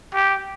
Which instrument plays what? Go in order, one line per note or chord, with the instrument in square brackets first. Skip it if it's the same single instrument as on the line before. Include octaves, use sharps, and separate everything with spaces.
[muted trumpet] G4